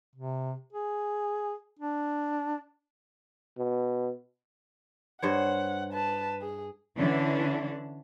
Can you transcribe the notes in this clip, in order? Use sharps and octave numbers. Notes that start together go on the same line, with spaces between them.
C3
G#4
D4
B2
G2 C5 C#5 F#5
B4 A5
G#4
D3 E3 C#4 D4